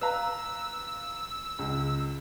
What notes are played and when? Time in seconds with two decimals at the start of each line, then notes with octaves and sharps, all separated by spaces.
0.01 B4 F5 A#5 E6
1.59 C#2